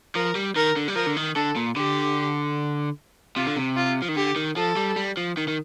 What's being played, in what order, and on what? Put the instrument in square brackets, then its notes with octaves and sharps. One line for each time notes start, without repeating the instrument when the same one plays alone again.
[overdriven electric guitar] F3 [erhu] A#4
[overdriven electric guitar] G3
[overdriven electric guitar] D#3 [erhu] A#4
[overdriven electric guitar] D3
G3
[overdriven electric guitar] F3 [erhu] A#4
[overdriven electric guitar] D3
D#3
[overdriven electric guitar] D3 [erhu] A4
[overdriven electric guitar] A#2
[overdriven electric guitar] D3 [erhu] G4
[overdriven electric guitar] C3 [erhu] F4
[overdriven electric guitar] D3
C3
[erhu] F4
[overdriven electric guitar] F3
D#3
[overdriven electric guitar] D3 [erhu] G4
[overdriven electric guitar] D#3
[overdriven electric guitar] F3 [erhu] A4
[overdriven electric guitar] G3
G3
F3
D#3
D#3